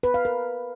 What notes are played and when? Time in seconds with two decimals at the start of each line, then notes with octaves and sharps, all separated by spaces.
0.03 B4
0.14 F5
0.25 A#4